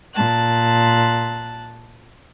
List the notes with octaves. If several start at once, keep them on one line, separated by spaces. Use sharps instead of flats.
A#2 A5 F#6